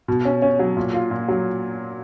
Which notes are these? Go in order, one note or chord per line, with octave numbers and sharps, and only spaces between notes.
B2
C#4
C#4
F#3
A#2
F4
A#2
F#3